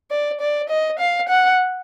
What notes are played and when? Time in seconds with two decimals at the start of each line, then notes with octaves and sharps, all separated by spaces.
0.11 D5
0.41 D5
0.70 D#5
0.99 F5
1.29 F#5